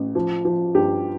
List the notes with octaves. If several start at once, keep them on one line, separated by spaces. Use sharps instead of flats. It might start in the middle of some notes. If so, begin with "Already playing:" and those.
Already playing: A1
F3
F3
G2 G4